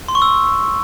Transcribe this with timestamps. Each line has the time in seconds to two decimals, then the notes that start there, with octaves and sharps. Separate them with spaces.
0.08 C6
0.15 C#6
0.22 E6